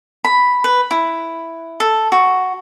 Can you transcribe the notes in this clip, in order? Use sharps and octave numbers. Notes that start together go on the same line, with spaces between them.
B5
B4
E4
A4
F#4